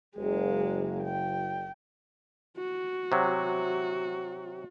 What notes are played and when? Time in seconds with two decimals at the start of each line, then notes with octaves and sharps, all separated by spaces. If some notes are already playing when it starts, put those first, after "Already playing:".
0.17 F#1 G#3 A#3
1.03 G5
2.57 F#4
3.12 C3 F#3